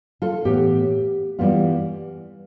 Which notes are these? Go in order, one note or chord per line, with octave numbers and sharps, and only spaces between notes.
F4 A4
A2 E3 B3 G4
E3 G3 B3 F4